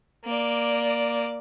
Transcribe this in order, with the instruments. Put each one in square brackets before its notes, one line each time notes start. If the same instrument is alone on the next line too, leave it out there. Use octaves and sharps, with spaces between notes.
[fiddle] A#3 D5